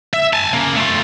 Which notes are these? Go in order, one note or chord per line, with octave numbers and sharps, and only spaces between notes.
E5
G#5 A5
C#3 A#3
A3 F4